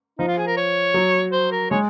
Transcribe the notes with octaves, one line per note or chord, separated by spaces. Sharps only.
F3 D#4
F4
G#4
A#4
C#5
F#3
C5
A#4
G#3 C#5